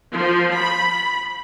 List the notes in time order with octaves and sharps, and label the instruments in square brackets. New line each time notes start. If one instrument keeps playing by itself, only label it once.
[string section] F3
B5